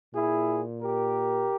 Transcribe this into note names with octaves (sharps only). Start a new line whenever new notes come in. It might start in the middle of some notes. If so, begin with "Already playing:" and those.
A#2 E4 G#4
G4 A#4